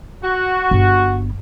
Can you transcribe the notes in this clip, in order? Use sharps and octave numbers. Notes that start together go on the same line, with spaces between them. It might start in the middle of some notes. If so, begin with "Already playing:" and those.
F#4
G1